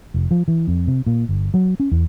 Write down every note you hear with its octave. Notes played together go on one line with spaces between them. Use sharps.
F1
F3
E3
F2
C3
A#2
G1
F#3
C#4
E2